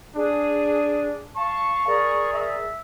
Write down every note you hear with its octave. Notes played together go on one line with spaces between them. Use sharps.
D4 G#4
F5 A5 C#6
G#4 A#4 D5
E5